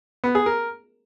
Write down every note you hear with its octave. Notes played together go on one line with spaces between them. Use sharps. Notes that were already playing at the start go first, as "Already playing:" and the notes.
B3
G#4
A#4